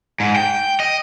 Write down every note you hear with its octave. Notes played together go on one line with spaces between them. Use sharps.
G#2
G5
D#5